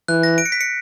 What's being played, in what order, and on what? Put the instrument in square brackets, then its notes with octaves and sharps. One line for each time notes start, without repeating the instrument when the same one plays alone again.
[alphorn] E3 [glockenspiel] F#6
[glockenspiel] A#6
D7
C#7
B6
C#7